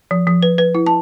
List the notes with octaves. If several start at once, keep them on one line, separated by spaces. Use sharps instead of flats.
F3
F3
B4
B4
E4
A5